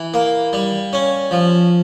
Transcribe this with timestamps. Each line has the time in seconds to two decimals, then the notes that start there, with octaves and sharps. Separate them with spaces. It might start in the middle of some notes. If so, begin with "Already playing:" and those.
Already playing: E3 E4
0.14 A#3
0.53 G3
0.93 C#4
1.31 F3